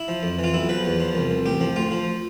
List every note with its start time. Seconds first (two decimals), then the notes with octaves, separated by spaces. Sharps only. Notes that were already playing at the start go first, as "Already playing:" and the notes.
Already playing: E4
0.08 F3
0.23 F2
0.39 E3
0.44 F4
0.54 B1 E4
0.69 F3 B4
0.85 E2
1.00 F3
1.15 C2
1.31 C2
1.46 A1 G4
1.61 F3
1.76 D2 F4
1.92 F3